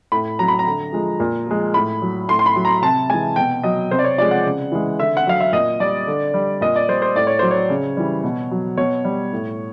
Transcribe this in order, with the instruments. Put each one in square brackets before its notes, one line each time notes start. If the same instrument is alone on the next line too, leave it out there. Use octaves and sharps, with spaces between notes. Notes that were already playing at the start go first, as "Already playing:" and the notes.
[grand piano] A2 B5
F#3 A#5
B5
A#5
D3
F3 G#3
A#2
F3 G#3
A2 B5
F#3
A2 C6
C6
B5
F#3
A#5
C3 A5
E3 G#3 G#5
B2 G5
F#3 D#5
C3 C5
D5
C#5
F3 G#3 D5
F#5
C#3
E3 G#3
D3 E5
F#5
F#3 F5
E5
A#2 D#5
G3 D5
D3
G3
A#2 D#5
D5
G3 C5
C5
A2 D5
C#5
F#3 C5
C#5
C#3
E3 G3
B2
F#3
B2 C#5
G3
A2